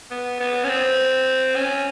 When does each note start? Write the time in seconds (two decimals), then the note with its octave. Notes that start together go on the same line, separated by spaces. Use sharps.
0.11 B3
0.40 B3
0.64 C#4
0.68 C4
1.55 C#4